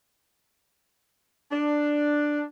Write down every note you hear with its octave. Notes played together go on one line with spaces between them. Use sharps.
D4